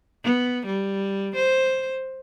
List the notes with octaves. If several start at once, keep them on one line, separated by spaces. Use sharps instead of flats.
B3
G3
C5